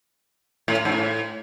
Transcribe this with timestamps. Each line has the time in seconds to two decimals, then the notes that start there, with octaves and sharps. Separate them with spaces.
0.68 A2
0.85 G#2
0.92 A2